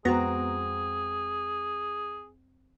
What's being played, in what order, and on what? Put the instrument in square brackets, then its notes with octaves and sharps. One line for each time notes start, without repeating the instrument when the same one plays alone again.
[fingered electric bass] F2 G#3 [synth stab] B3 A#5 [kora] C4 F#4 [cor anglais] G#4